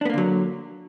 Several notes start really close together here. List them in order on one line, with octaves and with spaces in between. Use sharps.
D4 B3 A#3 D3 F#3